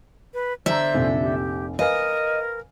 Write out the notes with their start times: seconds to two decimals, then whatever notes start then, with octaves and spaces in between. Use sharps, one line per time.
0.34 B4
0.66 D3 C5 E5 A#5 E6
0.94 F1 A#1 C3
1.21 G4
1.79 A#4 B4 D#5 F5 G#5